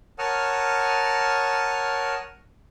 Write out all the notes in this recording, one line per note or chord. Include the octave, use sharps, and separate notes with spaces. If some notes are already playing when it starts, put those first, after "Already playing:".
A#4 C#5 F#5 A5 D#6 F6